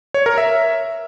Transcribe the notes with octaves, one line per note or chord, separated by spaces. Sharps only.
C#5
A#4
E5